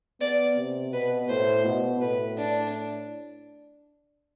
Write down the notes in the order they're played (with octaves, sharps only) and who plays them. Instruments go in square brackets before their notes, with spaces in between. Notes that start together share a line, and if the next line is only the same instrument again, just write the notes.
[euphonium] B3 [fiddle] D5
[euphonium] C3
[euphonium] B2 [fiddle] B4
[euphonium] A2 [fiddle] C5
[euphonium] B2
[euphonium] A2 [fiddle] B4
[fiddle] D4